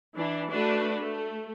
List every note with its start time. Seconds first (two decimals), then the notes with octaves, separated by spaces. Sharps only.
0.14 E3 D4
0.50 A3 D4 F#4 B4
0.98 A3